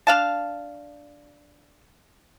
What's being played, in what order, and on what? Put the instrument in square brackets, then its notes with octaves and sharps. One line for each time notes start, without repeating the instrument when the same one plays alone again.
[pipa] D4 F5 A5